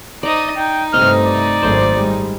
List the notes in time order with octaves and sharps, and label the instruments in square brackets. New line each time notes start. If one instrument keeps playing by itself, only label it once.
[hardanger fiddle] D#4 D#5 [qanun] D5 A#5
[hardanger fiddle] D#4 [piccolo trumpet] G5
[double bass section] G2 C3 A3 [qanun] C4 D#5 [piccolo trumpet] F6
[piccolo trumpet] D5
[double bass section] G#1 F#2 A3 [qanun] C5
[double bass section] G3 G#3